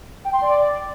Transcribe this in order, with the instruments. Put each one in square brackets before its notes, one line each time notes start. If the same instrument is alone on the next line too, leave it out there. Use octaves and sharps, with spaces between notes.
[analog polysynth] G5
C6
D5